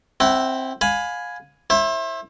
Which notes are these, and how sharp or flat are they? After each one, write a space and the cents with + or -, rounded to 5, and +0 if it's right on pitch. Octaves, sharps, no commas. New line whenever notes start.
C4 +10 E4 +0 F#5 +45
F5 +25 G#5 +0 B5 +10
E4 +0 C5 +40